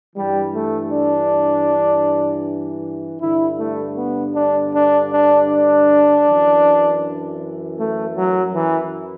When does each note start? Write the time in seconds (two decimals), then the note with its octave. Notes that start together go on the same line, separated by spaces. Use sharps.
0.15 G2 E3 G3
0.54 A3
0.92 D4
3.21 G2 D3 E4
3.59 A3
3.98 B3
4.35 D4
4.74 D4
5.12 D4
5.50 D4
6.26 F#2 E3
7.79 A3
8.17 F#3
8.55 E3